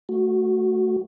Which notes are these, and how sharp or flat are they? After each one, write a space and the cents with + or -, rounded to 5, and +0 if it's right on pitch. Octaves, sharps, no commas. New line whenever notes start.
A3 +0 F#4 +0